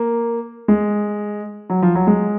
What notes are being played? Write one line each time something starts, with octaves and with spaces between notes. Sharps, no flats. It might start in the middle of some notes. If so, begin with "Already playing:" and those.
Already playing: A#3
G#3
F#3
F3
F#3
G#3